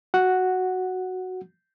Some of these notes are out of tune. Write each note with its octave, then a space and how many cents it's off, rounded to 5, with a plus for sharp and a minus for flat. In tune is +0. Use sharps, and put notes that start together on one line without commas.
F#4 +0 F#5 +0